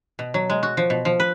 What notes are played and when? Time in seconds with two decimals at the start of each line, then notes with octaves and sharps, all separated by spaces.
0.19 B2
0.34 F#3
0.50 G#3
0.63 F#4
0.77 F3
0.90 B2
1.05 F3
1.20 B4